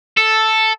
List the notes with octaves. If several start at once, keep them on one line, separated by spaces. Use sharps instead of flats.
A4